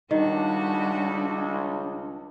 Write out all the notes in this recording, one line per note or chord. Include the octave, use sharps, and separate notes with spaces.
C#2 D#3 G3 D4 F#4